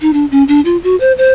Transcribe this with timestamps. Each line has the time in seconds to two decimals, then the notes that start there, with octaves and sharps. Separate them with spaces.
0.02 D#4
0.13 D4
0.31 C#4
0.48 D4
0.65 F4
0.84 F#4
1.00 C5
1.18 C5